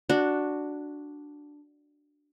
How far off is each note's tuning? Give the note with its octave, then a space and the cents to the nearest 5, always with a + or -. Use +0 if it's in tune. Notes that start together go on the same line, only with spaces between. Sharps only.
D4 +0 F#4 +0